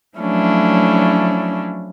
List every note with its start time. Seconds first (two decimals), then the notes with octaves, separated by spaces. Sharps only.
0.17 F3 F#3 A3 C#4 D4 E4